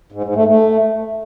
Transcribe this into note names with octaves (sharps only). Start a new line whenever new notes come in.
G#2
G#2
A3
A3